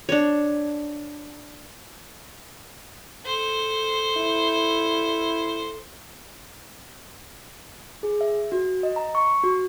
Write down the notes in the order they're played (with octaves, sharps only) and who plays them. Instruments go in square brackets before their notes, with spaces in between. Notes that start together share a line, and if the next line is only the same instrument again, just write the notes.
[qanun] D4 C#5
[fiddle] A4 C5
[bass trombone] E4
[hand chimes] G#4
E5
F#4
D#5
A#5
C#6
F#4